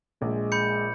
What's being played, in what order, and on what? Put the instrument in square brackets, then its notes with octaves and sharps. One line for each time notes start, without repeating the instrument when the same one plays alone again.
[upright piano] A#1 [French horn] G#3
[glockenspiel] B5 G6 C#7